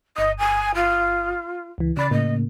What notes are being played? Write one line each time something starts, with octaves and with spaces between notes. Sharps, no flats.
G1 D#5 D#6
G#5
F4
C#2 E3
C#3 D5 B5 A6
A2 C#3 A#3 D#5